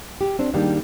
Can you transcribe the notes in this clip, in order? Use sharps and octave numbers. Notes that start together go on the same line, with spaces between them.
G4
C4 D4
D#3 G3 G#3 A#3 D4